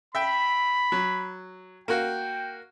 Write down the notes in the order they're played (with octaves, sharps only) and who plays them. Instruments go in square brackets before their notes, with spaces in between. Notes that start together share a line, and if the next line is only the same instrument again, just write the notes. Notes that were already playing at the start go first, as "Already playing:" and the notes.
[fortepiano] E5 G5 [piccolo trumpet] B5
[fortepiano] F#3
[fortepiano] A#3 F#4 [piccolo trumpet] G5